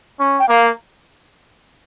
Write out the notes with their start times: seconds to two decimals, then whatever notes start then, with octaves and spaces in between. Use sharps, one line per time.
0.20 C#4
0.39 G5
0.48 A#3 F5